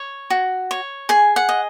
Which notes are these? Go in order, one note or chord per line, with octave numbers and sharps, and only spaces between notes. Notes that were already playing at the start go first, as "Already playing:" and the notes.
Already playing: C#5
F#4
C#5
G#4 G#5
F#5
D#5